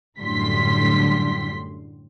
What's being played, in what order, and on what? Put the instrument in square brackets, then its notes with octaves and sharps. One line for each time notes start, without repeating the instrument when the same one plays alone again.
[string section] F#2 A2 D3 G3 C6 B6